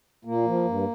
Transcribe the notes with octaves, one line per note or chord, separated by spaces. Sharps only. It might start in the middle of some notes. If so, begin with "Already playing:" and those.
A#2 A#3
F3
G2